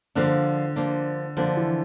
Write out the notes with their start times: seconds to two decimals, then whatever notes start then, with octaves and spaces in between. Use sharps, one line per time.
0.15 D3 F3 A#3 D4
0.76 F3 A#3 D4
1.37 D3 F3 A#3 D4
1.57 E3